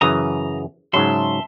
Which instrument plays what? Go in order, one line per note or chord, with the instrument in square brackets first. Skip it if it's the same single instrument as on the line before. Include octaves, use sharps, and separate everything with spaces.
[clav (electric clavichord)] F#2 C#3 E3 [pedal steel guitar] A#5 D#6
[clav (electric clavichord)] G#2 C#3 F#3 [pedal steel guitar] E5 A5 C6